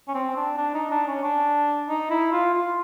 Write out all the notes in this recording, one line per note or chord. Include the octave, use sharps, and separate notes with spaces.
C#4
C4
D4
D4
D#4
D4
C#4
D4
D#4
E4
F4
F4